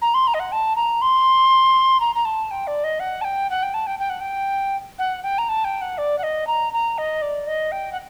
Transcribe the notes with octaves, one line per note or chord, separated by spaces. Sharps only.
A#5
C6
A#5
D#5
F#5
A5
A#5
C6
A#5
A#5
A5
G5
D5
D#5
F#5
A5
G5
F#5
G5
A5
G5
G5
F#5
G5
F#5
G5
A#5
A5
G5
F#5
D5
F#5
D#5
A#5
A#5
D#5
D5
D#5
G5
F#5